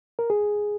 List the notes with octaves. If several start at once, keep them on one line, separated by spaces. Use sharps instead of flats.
A#4
G#4